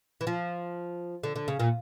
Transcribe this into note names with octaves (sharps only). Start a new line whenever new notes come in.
E3
F3
D3
D3
C#3
A#2